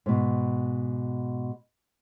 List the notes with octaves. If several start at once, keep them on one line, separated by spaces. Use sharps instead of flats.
G#2 B2